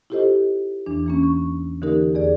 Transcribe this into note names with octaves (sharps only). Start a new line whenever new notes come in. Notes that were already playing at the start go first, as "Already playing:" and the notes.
E4 F4 G4 A4 C5 D#5
E2 E3 D4
E3 A#3 C#4
C#6
D3 E3 A#3 D#4 G4 A#4
E2 G#4 D5